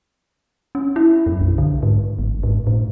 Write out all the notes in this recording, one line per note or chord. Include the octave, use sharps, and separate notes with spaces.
C#4
E4
F#2
B1
D3
G#2
G#1
G#2
A2